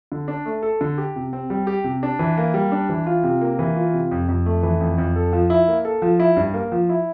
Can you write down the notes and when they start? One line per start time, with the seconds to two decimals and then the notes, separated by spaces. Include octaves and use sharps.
0.12 D3
0.28 D4
0.46 A3
0.63 A4
0.81 D3
0.98 G4
1.16 C3
1.33 C4
1.50 G3
1.67 G4
1.84 C3
2.03 D4
2.19 E3
2.37 A#3
2.54 G3
2.72 D4
2.89 E3
3.06 F4
3.24 C3
3.41 A#3
3.59 E3
3.76 F4
3.93 C3
4.11 F2
4.28 F2
4.46 A3
4.63 E3
4.80 F2
4.98 F2
5.16 A4
5.33 F3
5.50 E4
5.68 A#3
5.85 A4
6.02 F3
6.20 E4
6.37 G2
6.54 A#3
6.72 F3
6.89 E4